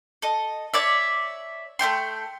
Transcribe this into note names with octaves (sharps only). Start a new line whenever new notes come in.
A4 D#5
C#5 D5 E5
A3 E4 G5 C6